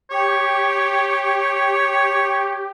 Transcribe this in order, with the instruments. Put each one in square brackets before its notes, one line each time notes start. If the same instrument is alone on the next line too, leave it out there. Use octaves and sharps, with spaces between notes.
[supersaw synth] G4 [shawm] C#5